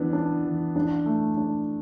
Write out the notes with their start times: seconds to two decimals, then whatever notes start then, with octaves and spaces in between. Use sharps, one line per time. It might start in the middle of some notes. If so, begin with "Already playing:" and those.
Already playing: E3 B3 D4
0.13 D4
0.45 E3
0.76 D4
1.06 A3
1.37 D4